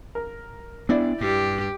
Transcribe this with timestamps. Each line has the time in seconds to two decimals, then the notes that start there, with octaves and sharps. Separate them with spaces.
0.15 A#4
0.89 B3 D4 E4 D5
1.21 G2 G4